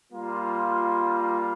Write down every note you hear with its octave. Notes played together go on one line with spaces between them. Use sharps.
G3 A#3 F4